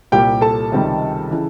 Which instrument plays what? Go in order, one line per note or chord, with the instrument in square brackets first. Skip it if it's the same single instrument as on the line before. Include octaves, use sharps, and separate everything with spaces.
[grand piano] C2 A#2 G3 G4 G5
A4 A5
C#2 C3 D#3 G3
C#3 E3